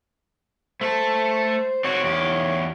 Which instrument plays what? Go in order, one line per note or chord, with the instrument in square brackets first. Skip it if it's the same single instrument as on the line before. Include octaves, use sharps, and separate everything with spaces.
[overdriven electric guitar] A3 A4 [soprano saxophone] C5
[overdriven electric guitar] C4 F#4 [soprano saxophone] C#5
[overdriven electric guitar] E2 G4